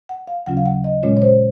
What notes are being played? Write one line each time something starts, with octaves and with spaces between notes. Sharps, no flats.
F#5
F5
D#2 C#3 F#3 C#4 F4 F#5
F5
F#5
D#5
A#2 G#3 C#4 F4 C#5
C#5
C5